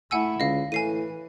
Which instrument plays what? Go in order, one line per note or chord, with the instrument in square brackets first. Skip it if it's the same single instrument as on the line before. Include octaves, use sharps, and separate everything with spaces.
[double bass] A3 E4 [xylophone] F#5 G#5 E6
[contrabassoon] C#2 [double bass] D3 [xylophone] D#5 F5
[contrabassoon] A2 [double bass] E3 [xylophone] G#5 C7 D#7